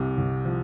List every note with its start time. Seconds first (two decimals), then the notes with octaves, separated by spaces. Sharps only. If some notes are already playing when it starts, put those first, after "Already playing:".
Already playing: C2 C3
0.18 C2
0.45 F3